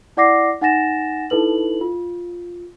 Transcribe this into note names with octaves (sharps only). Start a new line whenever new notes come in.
E4 D5 F#5 D6 A#6 C7
D#4 F#5 G#5 A6 A#6 E7
D#4 E4 A4 B4 F#7
F4